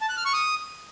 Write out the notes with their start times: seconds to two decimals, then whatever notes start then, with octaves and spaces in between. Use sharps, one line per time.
0.01 A5
0.09 F#6
0.17 F6
0.25 C#6
0.34 D#6